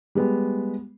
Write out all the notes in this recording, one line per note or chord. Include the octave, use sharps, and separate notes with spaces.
G3 G#3 B3